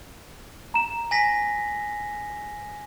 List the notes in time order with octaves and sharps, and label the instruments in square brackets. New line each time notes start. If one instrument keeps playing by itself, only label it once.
[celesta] A#5 E7
[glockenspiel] G#5 A#6 B6